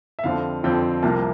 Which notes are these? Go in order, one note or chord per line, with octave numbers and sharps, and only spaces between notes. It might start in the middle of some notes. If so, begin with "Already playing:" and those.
E5
F2 D3 F3 C4 F5
F2 D3 F3 C4 G5
C2 C3 F3 A#3 A5